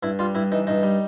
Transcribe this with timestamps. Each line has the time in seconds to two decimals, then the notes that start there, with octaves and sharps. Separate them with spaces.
0.03 G2 E4
0.19 G3 F4
0.35 G2 E4
0.52 E3 D#4
0.67 G2 D#4
0.83 G3